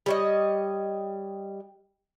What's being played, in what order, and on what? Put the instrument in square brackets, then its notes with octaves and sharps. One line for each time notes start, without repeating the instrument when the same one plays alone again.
[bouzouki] G3 C#5 D#5